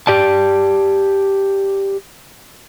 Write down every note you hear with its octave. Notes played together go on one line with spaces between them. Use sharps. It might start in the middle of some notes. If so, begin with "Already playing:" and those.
G4 D5 A5